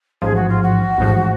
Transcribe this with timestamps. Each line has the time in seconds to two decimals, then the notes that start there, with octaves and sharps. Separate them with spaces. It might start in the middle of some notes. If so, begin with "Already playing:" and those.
0.22 A1 G#2 F3 G#4
0.36 F#4
0.49 F4
0.63 F#4
0.98 A1 G#2 F3